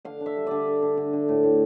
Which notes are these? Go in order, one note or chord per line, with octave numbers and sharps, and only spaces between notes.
D3 F5
D4
E5
G3
D3 D5
D3
D3
D3
D3
A2
A2